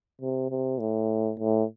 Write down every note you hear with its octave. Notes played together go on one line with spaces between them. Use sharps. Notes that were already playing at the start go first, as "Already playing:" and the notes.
C3
C3
A2
A2